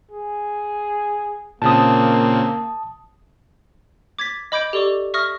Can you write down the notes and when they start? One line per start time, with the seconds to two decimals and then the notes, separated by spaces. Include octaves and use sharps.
0.11 G#4
1.62 A#2 C#3 A#3 C4 A5 D#6
4.19 D6 G#6 A6 B6
4.52 D#5 B5 D6 G6 G#6 D7
4.73 G4 A4 D5 C#6 D6
5.14 E5 C#6 D#6 F6 A#6